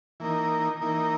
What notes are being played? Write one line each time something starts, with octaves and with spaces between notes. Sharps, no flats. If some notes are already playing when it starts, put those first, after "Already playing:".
E3 A#3 D#4 A#4
E3 A#3 D#4 A#4